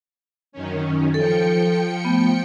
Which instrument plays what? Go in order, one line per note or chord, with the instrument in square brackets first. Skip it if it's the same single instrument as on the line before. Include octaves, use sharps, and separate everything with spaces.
[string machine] F#2 D#3 C#4
[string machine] F3 G5 C#7 [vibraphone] A4
[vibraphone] A3 B3